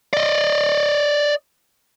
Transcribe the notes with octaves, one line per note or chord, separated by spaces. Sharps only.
D5 D#5